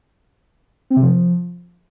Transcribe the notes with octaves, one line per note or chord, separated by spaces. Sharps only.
C4
C3
F3